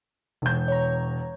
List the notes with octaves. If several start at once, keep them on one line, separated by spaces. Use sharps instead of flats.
E1 G6
C#5 A#5